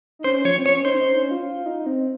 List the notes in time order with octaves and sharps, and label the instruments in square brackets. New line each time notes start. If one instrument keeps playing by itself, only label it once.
[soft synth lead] D#4
[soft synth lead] C#4 [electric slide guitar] C5
[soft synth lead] F3 [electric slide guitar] C#5
[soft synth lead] C4
[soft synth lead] C#4 [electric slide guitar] C#5
[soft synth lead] D#4 [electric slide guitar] C5
[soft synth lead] C#4
D#4
C#4
F4
F4
D#4
C4